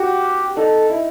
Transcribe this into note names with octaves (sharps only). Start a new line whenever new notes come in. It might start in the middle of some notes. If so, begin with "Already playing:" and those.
Already playing: F#4 G4
D#4 A4
E4